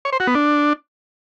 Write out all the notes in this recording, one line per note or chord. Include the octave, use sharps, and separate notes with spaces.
C#5
C5
F#4
B3
D4